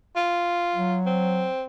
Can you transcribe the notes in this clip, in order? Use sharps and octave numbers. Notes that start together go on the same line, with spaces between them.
F4
F#3
C4